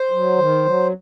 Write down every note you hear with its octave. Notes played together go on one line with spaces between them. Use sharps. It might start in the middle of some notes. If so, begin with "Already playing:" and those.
Already playing: C5
F#3
D#3
F#3